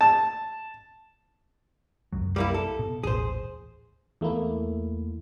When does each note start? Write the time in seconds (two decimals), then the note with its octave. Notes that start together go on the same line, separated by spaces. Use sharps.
0.01 A5
2.12 C2 F#2 F#3
2.36 G3 A#3 E4
2.54 A4
2.79 B2
3.03 D#1 A1 G#4 C5
4.21 E2 A3 A#3 E4